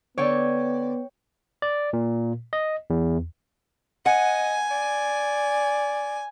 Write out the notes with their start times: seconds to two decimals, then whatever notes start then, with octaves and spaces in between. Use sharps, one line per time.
0.18 D3 B3 C#5 D5 G5
1.62 D5
1.93 A#2
2.53 D#5
2.90 E2
4.06 D#5 F#5 G#5
4.71 D5